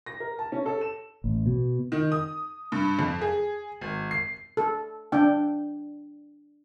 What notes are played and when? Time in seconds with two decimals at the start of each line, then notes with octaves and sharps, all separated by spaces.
0.06 A#6
0.20 A#4
0.39 A5
0.52 C#4
0.66 A4
0.81 E7
1.24 A1
1.46 B2
1.92 D#3
2.12 D#6
2.72 G2
2.99 F2
3.21 G#4
3.81 G#1
4.11 C7
4.57 A4
5.12 D4 G5